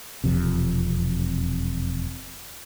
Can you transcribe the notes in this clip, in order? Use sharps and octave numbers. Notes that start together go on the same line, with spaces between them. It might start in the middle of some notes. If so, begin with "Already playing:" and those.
E1 F2 C3